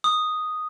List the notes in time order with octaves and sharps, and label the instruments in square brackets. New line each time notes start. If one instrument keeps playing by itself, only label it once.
[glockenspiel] D#6